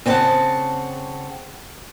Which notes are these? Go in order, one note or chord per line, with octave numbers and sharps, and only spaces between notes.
C#3 C4 C#5 D#5 F#5 A5